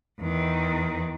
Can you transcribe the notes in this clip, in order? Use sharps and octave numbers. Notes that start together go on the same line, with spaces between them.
E2 D#3